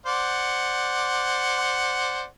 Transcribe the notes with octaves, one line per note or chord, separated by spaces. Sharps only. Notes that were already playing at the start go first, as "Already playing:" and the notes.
C5 D5 F#5